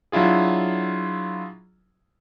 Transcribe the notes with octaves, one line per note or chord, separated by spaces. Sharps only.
F#3 D4 E4 F4 G#4